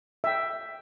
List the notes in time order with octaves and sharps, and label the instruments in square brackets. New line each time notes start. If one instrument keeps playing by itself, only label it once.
[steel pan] E5 G5